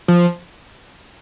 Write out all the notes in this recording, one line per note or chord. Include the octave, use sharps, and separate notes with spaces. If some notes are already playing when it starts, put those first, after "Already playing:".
F3